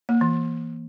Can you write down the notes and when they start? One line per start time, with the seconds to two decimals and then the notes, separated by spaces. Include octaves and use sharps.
0.09 A#3
0.21 E3